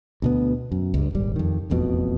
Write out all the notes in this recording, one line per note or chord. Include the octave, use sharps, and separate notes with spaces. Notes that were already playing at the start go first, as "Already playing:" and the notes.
D2 B2 B3
F#2
C#2 G2
D#1 G#1 G3
F2 D#3
E1 A1 F2 B2